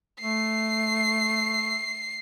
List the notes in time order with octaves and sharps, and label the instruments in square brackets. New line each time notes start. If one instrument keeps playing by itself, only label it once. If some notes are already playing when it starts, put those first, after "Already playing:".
[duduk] A3 [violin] C7